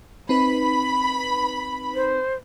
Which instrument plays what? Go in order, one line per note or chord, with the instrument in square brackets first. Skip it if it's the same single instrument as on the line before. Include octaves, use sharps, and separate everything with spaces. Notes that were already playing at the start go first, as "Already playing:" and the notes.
[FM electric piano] C4 D#4 B4 [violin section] B5
[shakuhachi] C5